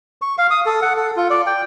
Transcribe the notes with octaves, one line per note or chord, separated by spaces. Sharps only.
C#6
F5
D#6
A4
F#5
A4
F4
D5
G5